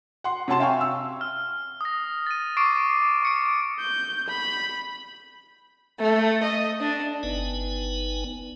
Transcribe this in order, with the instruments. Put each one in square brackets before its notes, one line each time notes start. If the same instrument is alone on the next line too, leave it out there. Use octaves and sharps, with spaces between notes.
[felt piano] F#5 C6
C3 C#4 F#4 A5 C6 E7
E5 F5 G5 G#5 C#6
E6
[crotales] F6
D#6 A#6
A6 D#7
C#6 D6 C7 D7
C#6 C#7 D7
[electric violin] G6
B5
[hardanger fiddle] A3
D#5
D4
[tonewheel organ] G1 B3 D#4 B4 G#5